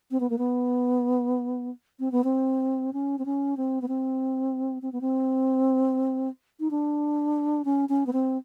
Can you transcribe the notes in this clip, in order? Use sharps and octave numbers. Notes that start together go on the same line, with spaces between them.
C4
B3
A#3
B3
C4
B3
C4
C#4
C4
C#4
C4
B3
C4
C4
B3
C4
D#4
D4
C#4
C#4
B3
C4